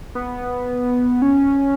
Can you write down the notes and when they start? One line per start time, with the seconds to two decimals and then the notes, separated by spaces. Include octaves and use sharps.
0.15 B3
1.22 C#4